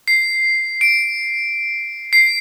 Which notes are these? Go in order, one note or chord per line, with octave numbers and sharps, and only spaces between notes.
C7
D7
C7